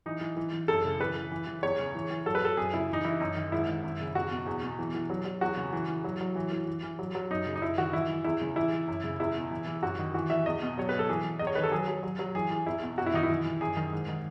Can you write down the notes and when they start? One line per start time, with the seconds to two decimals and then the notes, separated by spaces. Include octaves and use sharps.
0.06 E3 D#4
0.21 E3
0.37 E3
0.53 E3
0.68 F#2 A4
0.84 C#3
0.99 E3 B4
1.16 E3
1.31 E3
1.47 E3
1.63 E2 C#5
1.79 C#3
1.95 E3
2.10 E3
2.26 F#3 A4
2.35 B4
2.42 F#3 A4
2.57 F#2 G#4
2.74 C#3 E4
2.89 E3 D#4
3.04 E3 E4
3.20 F#2 D#4
3.36 D#3
3.52 G#2 E4
3.68 D#3
3.84 F#2
4.00 C#3
4.15 E2 F#4
4.31 B2
4.46 E2
4.63 B2
4.79 E3
4.95 E3
5.10 F#3
5.25 F#3
5.41 E2 F#4
5.57 C#3
5.73 E3
5.89 E3
6.04 F#3
6.21 F#3
6.36 E3
6.52 E3
6.67 E3
6.83 E3
6.99 F#3
7.15 F#3
7.30 F#2 D#4
7.46 C#3
7.56 D#4
7.62 F#2 E4
7.78 D#3 F#4
7.93 E3 E4
8.09 E3
8.24 E2 E4
8.41 C#3
8.56 E3 E4
8.73 E3
8.88 F#2
9.04 C#3
9.19 E2 E4
9.36 B2
9.51 E3
9.66 E3
9.82 F#2 F#4
9.99 D#3
10.14 E3 F#4
10.30 E3 E5
10.46 E2 D#5
10.62 B2
10.78 F#3 C#5
10.89 F#3 B4
10.99 A4
11.09 E3 G#4
11.24 E3
11.39 E2 D#5
11.47 C#5
11.55 D#3 B4
11.63 A4
11.72 F#3 G#4
11.88 F#3
12.03 F#3
12.19 F#3
12.35 E3 G#4
12.50 E3 G#4
12.66 E2 E4
12.82 B2
12.98 F#2 F#4
13.06 E4
13.14 D#3 D#4
13.23 E4
13.30 E3
13.45 E3
13.61 F#2 G#4
13.77 D#3
13.92 G#2
14.08 D#3